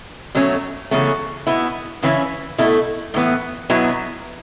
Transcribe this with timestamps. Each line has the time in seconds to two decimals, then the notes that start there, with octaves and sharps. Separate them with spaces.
0.35 B2 F#3 A3 C#4
0.91 E2 C#3 F#3 A3 C#4
1.47 B2 B3 E4
2.02 C#3 E3 C#4 E4
2.58 B2 A3 E4
3.14 A2 E3 B3
3.70 B2 F#3 B3 E4